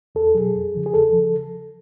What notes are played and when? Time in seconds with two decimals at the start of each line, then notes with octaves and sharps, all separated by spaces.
0.15 E2 A4
0.35 B2 F#3 G#4
0.54 F2
0.75 C#3 F3
0.86 G#4
0.93 E2 A4
1.13 C#3 F3